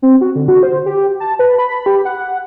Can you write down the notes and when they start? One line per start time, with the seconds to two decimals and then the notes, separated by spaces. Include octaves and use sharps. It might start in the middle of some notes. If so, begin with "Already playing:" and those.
0.02 C4
0.21 F#4
0.35 D3
0.48 F#4
0.63 C5
0.86 G4
1.20 A5
1.39 B4
1.58 B5
1.86 G4
2.05 F#5